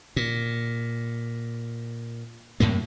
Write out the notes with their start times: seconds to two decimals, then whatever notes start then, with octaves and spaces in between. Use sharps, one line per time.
0.16 A#2
2.60 F#2 A2 C3 A#3